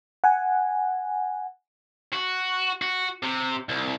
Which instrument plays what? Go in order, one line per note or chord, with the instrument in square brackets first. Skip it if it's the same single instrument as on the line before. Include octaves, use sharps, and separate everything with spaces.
[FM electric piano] F#5 G#5
[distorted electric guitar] F#4
F#4
C3
C2